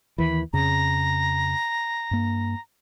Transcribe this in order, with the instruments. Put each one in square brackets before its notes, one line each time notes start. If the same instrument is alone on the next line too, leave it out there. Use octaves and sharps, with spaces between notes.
[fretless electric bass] D#2 D#3 E3 [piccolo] B5
[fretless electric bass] F2 C#3 [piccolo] A#5
[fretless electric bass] G2 A#3